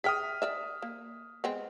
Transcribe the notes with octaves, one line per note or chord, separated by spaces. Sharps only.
G#4 E5 G5 D#6 F6 B6
A#4 D5 E5
A#3
G#3 B3 C4